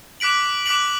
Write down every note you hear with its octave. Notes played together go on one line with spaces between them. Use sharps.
D6 F#6 B6 D7 F#7
D6 F#6 B6 D7 F#7